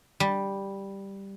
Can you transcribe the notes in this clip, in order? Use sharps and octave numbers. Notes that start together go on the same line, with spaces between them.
G3